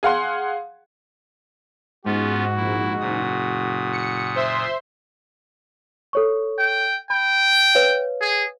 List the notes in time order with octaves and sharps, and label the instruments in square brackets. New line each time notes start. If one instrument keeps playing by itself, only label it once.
[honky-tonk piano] G#4 F5 F#5 C6
[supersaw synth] G#2 [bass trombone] G#3 [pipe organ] B3 C#4 F4 [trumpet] F#4
[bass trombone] A#1 [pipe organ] E4
[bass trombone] F#1 [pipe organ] A#2 D#6
[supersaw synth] C#7
C5 E5 C6
[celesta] A4 C#5 C#6
[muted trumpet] G5
[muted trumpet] G5 [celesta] B5
[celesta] B4 C#5 F5
[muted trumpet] G#4